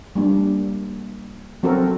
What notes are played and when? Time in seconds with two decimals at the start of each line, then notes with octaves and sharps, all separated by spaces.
0.15 G3 A#3 D4
1.63 F#3 C4 F#4 A4 A#4